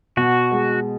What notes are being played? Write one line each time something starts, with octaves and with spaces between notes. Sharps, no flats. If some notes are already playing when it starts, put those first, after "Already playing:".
B2 F#4
G#3